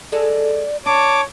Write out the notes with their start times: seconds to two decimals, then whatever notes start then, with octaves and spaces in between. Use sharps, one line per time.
0.12 G#3 A4 D5
0.86 D4 C#5 A5 D6